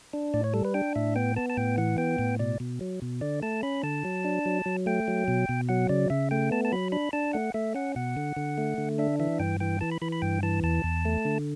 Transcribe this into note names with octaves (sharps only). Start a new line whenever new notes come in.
D4
A2 D5
C#5
G3 A4
B4
D4 G5
A2 E5
B3 G5
B3 A5
A5
A2 G5
E3 F#5
B3 G5
A2
B2 D5
B2
F#3
B2
D3 D5
A3 A5
C#4 B5
D3 A5
F#3
D4
F#3
F#3
A3 G5
F#3
B2
B2
F#3 F#5
C#3 D5
C#3 E5
A3 G5
B3 A5
A5
F#3 B5
D4 B5
D4 A5
A3 F#5
A3 E5
C#4 F#5
B2 F#5
D3
D3
A3
D3
D4 E5
E3 E5
G2 G5
E3 G5
E3 A5
B5
E3 B5
B5
G2 G5
E3 A5
E2 A5
E2
A3
D3